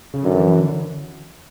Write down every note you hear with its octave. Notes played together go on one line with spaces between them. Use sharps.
C#3
F#2 D3
E3
E3
D3